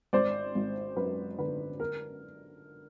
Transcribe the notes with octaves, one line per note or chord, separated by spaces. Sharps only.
G#1 C5 D5
G#1
F#2 B4
D3 B4
A#4